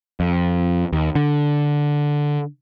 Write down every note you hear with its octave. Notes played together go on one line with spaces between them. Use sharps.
F2
D#2
D3